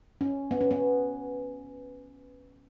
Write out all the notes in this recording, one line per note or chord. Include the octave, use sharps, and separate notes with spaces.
C#4
B3
C#4
B3